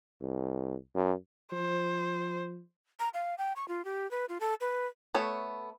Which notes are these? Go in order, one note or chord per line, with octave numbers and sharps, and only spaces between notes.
C2
F#2
F3 C5
A#5
F5
G5
C#6
F4
G4
B4
F4
A4
B4
A3 B3 A4 C#5